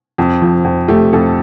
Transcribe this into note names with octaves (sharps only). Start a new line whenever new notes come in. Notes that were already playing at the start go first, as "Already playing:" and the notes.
F2
F3
F2
A3 G4
F2 A4